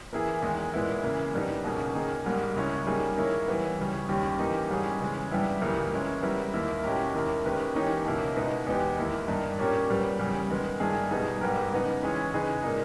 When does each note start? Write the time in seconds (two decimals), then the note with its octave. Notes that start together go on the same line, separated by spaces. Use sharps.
0.13 E3 A#3 E4 G#4
0.42 E2 D#3 G#3
0.74 A#2 G#3 B3 E4
1.03 C#3 E3 A#3 E4
1.34 G2 G3 B3 D#4
1.64 C#2 B2 A#3 C#4 G#4
1.95 D#3 A#3 D#4 G#4
2.26 G#2 G3 A#3
2.56 C#2 C#3 G#3 C#4 E4
2.87 G3 A#3 D#4 G#4
3.17 D#3 A#3 E4 A#4 C#5
3.48 E3 G3 B3
3.78 C#2 C#3 G3 C#4
4.08 D#2 D#3 G3 C#4 G4
4.39 E3 A#3 D#4 G4
4.69 G#2 G3 C#4 G#4
5.00 C#3 E3 G#3
5.31 G2 G3 B3 E4 G4
5.61 C#2 C#3 E3 G3 A#3
5.92 E3 G#3 C#4 E4
6.23 G3 B3 E4 A#4
6.54 D#2 D#3 A#3 E4
6.84 B2 G#3 C#4 G4 A#4
7.14 D#2 D#3 A#3 E4
7.45 D#3 G#3 C#4 G4 B4
7.75 E3 A#3 D#4 G4 C#5
8.05 C#2 B2 A#3 E4
8.36 B2 G#3 B3 D#4
8.66 E2 B2 G#3 B3 G4
8.97 D#2 D#3 A#3 E4
9.28 G2 D#3 A#3 D#4
9.59 A#2 A#3 C#4 G4 C#5
9.89 A#2 G3 B3
10.19 E2 C#3 G3
10.50 D#3 G#3 B3
10.80 G2 D#3 A#3 E4 G#4
11.11 B2 G3 B3 D#4 G#4
11.41 G#2 G3 B3 G4 A#4
11.72 C#3 G#3 B3 D#4
12.03 E3 G#3 C#4 G#4 C#5
12.33 C#3 G#3 D#4 G#4 B4
12.63 A#2 A#3 D#4